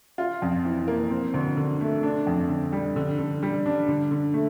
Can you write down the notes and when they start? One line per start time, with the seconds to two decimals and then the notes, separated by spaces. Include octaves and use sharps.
0.18 F4
0.42 F2
0.65 E3
0.88 A#3
1.10 C4
1.34 D2
1.57 D3
1.81 A3
2.03 D4
2.27 F2
2.49 D3
2.72 G3
2.96 D3
3.18 D3
3.43 G3
3.66 D4
3.88 D3
4.11 D3
4.34 A3